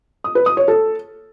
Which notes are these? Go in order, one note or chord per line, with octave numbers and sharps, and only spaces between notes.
D#6
B4
D#6
C#5
A4